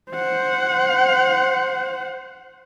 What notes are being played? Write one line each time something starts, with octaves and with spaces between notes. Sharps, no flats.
C5 F#5